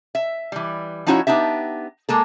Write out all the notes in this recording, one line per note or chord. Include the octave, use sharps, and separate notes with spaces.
E5
E3 G3
F3 C#4 D#4 E4 F#4 C#5
B3 D4 D#4 G4 E5
G#3 A#3 A4